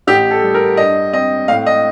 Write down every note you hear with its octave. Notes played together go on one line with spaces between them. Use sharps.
A1 G4
A4
G3
A#4
G2 D#5
C4 D#5
A2 F5
D#5